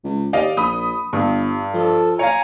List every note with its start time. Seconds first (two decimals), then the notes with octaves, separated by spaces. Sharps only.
0.04 C#2
0.33 D#2 D5 D#5 F5
0.57 A#1 B5 D#6
1.13 G1 G2
1.74 F3 A4
2.19 C#5 F5 G#5 A#5